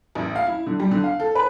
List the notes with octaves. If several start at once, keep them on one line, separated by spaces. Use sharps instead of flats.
A1
F5
E4
D3
G3
D3
F5
A4
B4